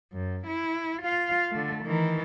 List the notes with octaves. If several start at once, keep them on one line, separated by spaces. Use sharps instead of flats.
F#2
E4
F4 F5
D3 A3
D#3 E3